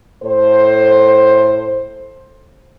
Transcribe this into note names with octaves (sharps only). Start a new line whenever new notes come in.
A2 A4 C5